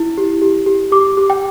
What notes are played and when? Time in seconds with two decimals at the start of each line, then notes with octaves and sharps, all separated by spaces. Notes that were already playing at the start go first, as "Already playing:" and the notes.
Already playing: E4
0.17 G4
0.42 G4
0.66 G4
0.92 G4 D6
1.17 G4
1.30 G5